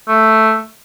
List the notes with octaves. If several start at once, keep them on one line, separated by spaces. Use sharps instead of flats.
A3